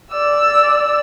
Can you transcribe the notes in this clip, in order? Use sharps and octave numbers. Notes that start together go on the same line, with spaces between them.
D5 E6